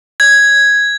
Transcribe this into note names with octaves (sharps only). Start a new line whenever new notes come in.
G#6